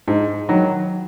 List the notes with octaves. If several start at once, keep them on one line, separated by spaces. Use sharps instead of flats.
G#2
D#3 F#3